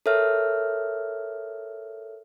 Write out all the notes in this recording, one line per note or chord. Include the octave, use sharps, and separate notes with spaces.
A4 A#4 C#5 E5 F6